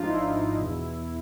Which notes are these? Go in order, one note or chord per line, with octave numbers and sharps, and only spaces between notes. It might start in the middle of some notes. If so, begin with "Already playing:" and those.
Already playing: G#1 G#2 F3 D4 D#4 F4
E4
E2 B2